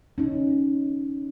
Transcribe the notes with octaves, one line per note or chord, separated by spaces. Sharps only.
C#4 D#4